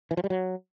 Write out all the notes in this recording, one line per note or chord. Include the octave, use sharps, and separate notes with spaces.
E3
F3
G3
F#3